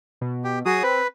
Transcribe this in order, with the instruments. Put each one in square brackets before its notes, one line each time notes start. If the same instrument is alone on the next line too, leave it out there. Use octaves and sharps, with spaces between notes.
[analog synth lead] B2
[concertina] G4
[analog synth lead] F#3 [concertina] F#4 G#4 D#6
[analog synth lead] C4 [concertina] B4